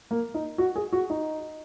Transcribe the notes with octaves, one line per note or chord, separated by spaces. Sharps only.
A#3
D#4
F#4
G#4
F#4
D#4